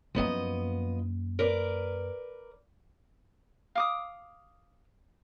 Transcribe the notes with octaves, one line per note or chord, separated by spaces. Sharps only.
F#2 F3 A#3 B3 D#5
A#4 B4 D5
F5 D6 D#6